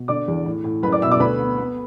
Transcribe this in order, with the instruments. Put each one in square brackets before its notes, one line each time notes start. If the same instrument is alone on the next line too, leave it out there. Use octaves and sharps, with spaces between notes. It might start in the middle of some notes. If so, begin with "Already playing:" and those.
Already playing: [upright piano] B2
D3 D5 D6
E2
A2
A2
F#1 B4 B5
D5 D6
B2 E5 E6
D5 D6
D2 B4 B5
B3
B3